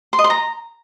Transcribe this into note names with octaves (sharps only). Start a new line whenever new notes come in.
C6
D#5
C6
A#5